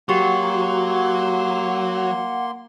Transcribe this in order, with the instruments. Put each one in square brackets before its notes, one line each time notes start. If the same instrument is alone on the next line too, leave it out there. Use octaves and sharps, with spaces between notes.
[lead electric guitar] F#3 [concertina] A#3 C6 [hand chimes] F#4 G4 C#6 [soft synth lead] F#5